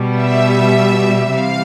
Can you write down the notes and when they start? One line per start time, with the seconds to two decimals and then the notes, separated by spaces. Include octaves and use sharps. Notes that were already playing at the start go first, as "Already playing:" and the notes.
Already playing: B2 G3
0.20 E5
1.33 C3 E3 G3 F5